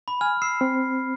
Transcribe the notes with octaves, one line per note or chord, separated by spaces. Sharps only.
B5
G#5 F6
E6 C7
C4